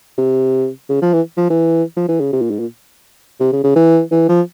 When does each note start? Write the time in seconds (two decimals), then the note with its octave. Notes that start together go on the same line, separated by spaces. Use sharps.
0.18 C3
0.89 C#3
1.02 F3
1.13 E3
1.37 F3
1.50 E3
1.96 F3
2.08 E3
2.20 C#3
2.32 C3
2.41 A#2
2.50 G#2
2.59 A#2
3.40 C3
3.52 C#3
3.63 C#3
3.75 E3
4.11 E3
4.28 F3